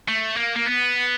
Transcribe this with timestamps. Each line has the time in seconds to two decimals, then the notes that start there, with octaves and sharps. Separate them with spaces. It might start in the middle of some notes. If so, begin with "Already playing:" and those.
0.08 A3
0.36 A#3
0.56 A#3
0.66 B3